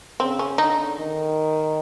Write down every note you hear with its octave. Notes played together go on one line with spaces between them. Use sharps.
C#3 C4
C#4
D3 D#4
D#3